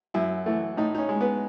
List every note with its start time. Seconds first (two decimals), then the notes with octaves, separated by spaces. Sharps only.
0.14 F#2 E4
0.46 E3 A3
0.77 A2 D#4
0.95 D#4
0.98 C#4
1.09 G#3
1.21 B3